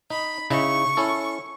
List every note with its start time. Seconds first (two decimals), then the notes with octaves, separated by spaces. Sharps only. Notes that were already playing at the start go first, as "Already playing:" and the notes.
0.10 D#4 B5
0.50 C#3 D#4 E4 C#6
0.97 C#4 E4 A4